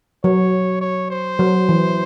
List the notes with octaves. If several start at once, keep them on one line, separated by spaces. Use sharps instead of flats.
F#3 C#5
C#5
C5
F#3
E3